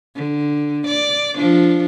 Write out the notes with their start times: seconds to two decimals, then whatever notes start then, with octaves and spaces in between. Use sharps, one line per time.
0.15 D3
0.87 D5
1.36 F3 D4